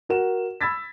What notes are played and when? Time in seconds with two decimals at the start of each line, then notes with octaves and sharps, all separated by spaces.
0.09 F#4 A#4 F#5 E7
0.61 B5 E6 G#6 A6 B6